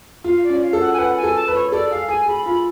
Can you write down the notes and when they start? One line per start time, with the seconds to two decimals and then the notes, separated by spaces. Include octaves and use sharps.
0.24 F4 F5
0.43 D5
0.49 C#4
0.62 F5
0.73 A4
0.80 F#5
0.93 G#5
0.98 B4 F#5
1.16 G#5
1.23 A4
1.35 A5
1.48 B4
1.54 C#5
1.72 A4 D5
1.91 G#4 F5
2.09 G#4 G#5
2.27 G#4 B5
2.45 F4 B5